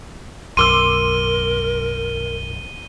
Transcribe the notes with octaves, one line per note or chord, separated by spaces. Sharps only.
B1 F#2 A#4 C6 D6 E6 D#7 G7